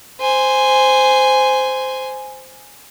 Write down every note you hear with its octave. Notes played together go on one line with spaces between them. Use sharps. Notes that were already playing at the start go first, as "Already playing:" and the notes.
C5 G#5